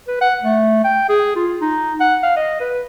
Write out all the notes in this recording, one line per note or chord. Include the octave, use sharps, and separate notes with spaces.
B4
F#5
A3
G5
G#4
F4
D#4
F#5
F5
D#5
B4